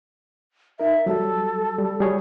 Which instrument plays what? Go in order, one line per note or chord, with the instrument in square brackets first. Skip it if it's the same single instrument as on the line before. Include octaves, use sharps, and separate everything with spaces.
[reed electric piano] D#4 A#4 [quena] E5
[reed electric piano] F#3 G3 [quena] A4
[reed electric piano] G3
G3 G#4 C#5